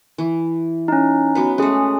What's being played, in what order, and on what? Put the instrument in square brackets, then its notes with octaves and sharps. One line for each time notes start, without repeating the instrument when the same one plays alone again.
[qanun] E3
[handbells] C#4 D#4
[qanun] F#3 B3 B4
[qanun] G#3 A3 [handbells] C#4 G#4